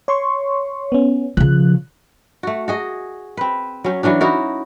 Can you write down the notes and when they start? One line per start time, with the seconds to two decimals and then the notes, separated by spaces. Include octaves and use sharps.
0.08 C#5 C6 C#6
0.92 B3 C#4
1.37 C#3 F3 F#6
2.43 A3 F#4
2.68 F#4 G#4 D#5
3.37 C4 B4
3.84 F#3 C#4
4.03 E3 F#3 C#4 D4
4.21 D#4 E4 F#4 A#4